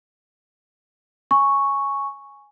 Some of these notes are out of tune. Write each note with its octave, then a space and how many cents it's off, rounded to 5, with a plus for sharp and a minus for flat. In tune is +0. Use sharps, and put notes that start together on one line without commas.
G#5 +0 C#6 +0